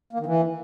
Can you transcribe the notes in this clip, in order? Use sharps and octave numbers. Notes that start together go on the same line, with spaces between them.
A#3
D#3
E3